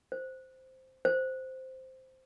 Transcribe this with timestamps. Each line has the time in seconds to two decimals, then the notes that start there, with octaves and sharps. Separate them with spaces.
0.12 C5
1.05 C5